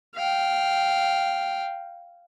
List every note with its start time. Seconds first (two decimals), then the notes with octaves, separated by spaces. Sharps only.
0.15 F5 G5